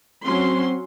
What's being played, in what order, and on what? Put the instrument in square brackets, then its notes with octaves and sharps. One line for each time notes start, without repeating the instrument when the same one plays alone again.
[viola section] F#3 C#4 C6 [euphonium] C4